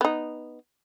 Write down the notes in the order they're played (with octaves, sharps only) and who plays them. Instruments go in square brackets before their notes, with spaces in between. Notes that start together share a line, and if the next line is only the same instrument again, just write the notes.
[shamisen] B3 D#4